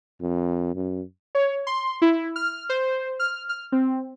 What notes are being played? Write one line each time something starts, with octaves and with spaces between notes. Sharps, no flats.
F2
F#2
C#5
C6
E4
F6
C5
F6
F6
C4